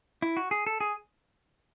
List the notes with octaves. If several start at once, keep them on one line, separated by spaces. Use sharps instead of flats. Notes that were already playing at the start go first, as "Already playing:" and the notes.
E4
F#4
G#4
A4
G#4